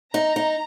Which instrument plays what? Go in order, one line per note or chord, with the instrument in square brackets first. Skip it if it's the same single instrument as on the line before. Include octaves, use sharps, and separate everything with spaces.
[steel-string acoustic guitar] D#4 [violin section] A#5
[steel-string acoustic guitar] D#4